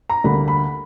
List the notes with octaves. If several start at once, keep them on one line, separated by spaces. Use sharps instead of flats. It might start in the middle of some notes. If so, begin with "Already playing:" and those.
A#5
D2 D3 G3 A#3 B5
B5